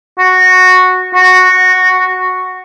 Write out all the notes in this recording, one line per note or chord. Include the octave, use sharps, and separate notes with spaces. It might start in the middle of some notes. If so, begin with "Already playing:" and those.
F#4
F#4